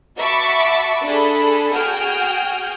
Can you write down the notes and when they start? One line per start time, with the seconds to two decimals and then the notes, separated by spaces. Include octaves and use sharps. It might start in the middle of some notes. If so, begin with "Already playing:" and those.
0.17 F#4 E5 A5 B5 C#6 D6
1.05 D4 G#4 A4 B5
1.73 F#4 G#4 G5 G#5 F6